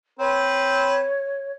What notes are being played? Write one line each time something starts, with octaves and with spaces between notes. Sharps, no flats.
C4 B4 C#5